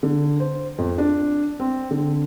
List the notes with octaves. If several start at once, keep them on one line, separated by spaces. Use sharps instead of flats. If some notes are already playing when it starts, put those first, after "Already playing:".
D3
C5
F2
D4
C4
D3